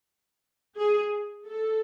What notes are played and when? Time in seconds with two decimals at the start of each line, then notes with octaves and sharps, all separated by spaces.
0.78 G#4
1.47 A4